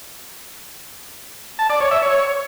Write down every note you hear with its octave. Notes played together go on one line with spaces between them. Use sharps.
A5
D5
C#5
E5
C#5